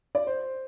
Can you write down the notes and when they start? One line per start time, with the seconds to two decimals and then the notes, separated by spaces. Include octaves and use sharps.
0.15 D5
0.27 C5